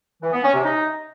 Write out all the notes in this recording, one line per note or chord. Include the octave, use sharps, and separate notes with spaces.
E3
B3
C#4
C3
D#4